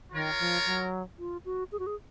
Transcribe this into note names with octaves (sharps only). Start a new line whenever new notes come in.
D#3 F4 A#4 C#5
F3
F#3
F4
F#4
G#4
F#4
G#4